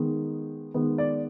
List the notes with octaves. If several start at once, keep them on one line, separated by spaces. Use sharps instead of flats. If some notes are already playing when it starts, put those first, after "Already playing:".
Already playing: D#3 G#3 B3
D#3 G#3 B3
D5